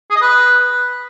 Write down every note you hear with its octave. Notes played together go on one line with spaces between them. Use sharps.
G#4
D#5
B4